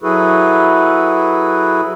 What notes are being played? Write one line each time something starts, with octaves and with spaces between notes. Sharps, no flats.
F#3 E4 F#4 G#4 A4 B4